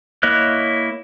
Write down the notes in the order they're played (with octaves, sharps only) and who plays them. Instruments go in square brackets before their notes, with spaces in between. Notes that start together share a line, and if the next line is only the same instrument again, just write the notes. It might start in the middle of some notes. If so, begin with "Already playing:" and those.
[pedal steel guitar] A#3 E4 C#5 D#5 F#6